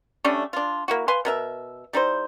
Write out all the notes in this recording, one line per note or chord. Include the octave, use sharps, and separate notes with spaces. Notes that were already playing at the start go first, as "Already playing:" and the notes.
G3 A3 C#4 D4
D4 F4
A#3 E4 F#4
B4 F5 G#5 C6
B2 A#4 E5
G3 D#4 E4 C5